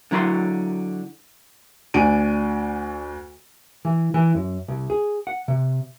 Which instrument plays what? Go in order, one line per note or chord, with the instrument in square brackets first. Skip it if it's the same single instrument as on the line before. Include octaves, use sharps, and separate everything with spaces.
[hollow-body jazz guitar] D3 F#3 E4 B5 C6
[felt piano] D2 D4 G#5 D7 D#7
[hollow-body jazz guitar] E3
E3
F#2
C2
G#4
F#5
C3